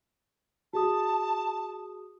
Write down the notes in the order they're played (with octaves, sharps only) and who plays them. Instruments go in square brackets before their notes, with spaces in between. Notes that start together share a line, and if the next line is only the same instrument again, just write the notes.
[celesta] F#4 G#4 D#6 [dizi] A5